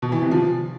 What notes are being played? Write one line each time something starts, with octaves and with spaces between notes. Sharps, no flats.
B2
E3
C3
F3